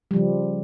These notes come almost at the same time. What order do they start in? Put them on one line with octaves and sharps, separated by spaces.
G3 F3 C#3